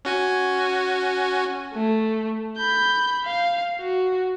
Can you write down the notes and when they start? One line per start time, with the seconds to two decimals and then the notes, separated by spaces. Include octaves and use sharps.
0.05 C#4 F#4 G#5
1.74 A3
2.58 B5 G6
3.25 F5
3.79 F#4